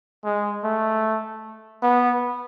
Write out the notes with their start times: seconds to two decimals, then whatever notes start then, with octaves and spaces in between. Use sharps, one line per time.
0.24 G#3
0.64 A3
1.82 B3